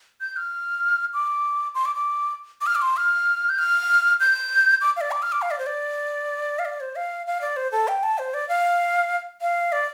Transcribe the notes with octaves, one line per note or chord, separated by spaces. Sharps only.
G6
F6
D6
C6
D6
D6
D6
F6
D6
C6
F6
G6
F6
G6
D6
F5
D5
D6
F6
D6
F5
D5
C5
D5
F5
D5
C5
F5
F5
D5
C5
A4
G5
A5
C5
D5
F5
F5
D5